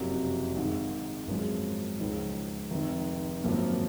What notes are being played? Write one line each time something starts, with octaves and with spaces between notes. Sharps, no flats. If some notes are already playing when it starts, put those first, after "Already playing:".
Already playing: F#1 F2 C3 F#3
G#1 G#2 D#3 G#3
G#1 F#2 F3 G#3
C#2 C#3 F3 G#3 D#4
F1 F2 D#3
G#1 F#2 F3 A#3